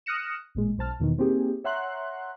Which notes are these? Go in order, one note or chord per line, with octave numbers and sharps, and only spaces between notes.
D#6 F6 F#6 A#6 C#7 E7
A1 A#2 G#3
B1 C5 A5 F6
E2 B2 D#3
A#3 C4 D#4 G4 G#4
C#5 E5 F#5 A#5 C6 F#6